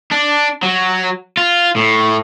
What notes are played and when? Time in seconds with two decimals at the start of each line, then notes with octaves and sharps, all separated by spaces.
0.11 D4
0.63 F#3
1.37 F4
1.76 A2